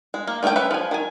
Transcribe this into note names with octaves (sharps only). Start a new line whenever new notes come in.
G#3
A#3
D#3 A3 A#3 C#4 G5
C#4 B4 E5
F3 G#5
D#3 G#5